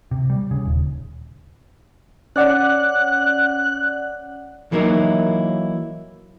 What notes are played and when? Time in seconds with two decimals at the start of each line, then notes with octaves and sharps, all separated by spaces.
0.11 C3
0.30 G3
0.51 C#3
0.65 D#1
2.36 C#4 D5 F#5 F#6
4.72 E3 F#3 A#3 D#4 E4